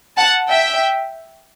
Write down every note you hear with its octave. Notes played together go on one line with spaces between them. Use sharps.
F#5 A5
E5 G5